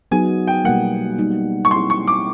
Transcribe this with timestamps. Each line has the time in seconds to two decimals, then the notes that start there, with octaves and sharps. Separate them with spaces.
0.11 F#3 B3 D#4 G#4 G#5
0.48 G5
0.65 B2 G3 A#3 F#5
1.19 G3 A#3 D#4
1.65 C#6
1.71 G3 C4 E4 G#4 C6
1.90 C#6
2.08 D6